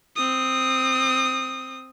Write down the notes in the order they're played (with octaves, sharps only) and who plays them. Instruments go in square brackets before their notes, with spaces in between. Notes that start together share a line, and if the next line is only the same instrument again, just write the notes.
[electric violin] C4 D#6